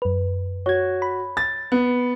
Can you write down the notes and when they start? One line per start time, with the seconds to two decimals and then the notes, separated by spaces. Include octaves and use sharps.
0.02 F#2 B4
0.66 F#4 C#5 G#6
1.02 B5
1.37 A6
1.72 B3